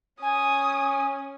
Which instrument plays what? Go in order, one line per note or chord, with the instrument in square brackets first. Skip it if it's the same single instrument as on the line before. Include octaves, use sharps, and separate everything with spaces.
[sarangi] C#4 [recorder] G#5 [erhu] D#6